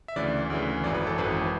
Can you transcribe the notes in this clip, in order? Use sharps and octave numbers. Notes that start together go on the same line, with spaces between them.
E5
D2 C#3 E3 D5
D2 C#3 E3
G#1 F#2 E3 D5
B4
A4
G#1 F#2 E3 B4